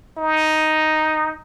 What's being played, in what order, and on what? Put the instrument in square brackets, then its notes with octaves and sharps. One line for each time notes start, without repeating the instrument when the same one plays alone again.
[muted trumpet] D#4